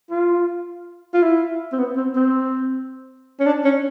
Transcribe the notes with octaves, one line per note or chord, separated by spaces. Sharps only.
F4
F4
E4
C4
B3
C4
C4
C#4
D4
C#4